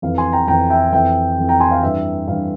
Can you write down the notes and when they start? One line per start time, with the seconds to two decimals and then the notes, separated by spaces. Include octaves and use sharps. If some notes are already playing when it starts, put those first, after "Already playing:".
0.02 F2 E3 F5
0.18 G#5 C6
0.32 G5 A#5
0.47 F2 E3 G5 A#5
0.70 E5 G5
0.92 F2 E3 E5 G5
1.38 F2 E3
1.49 G5 A#5
1.60 G#5 C6
1.71 F5
1.83 G2 E3 E5
2.27 G2 E3 F5